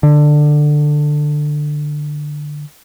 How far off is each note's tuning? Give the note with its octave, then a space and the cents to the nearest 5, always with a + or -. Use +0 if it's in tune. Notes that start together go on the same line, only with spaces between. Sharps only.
D3 +15